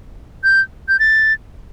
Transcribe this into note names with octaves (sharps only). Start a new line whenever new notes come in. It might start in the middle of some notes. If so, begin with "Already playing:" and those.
G6
G6
A6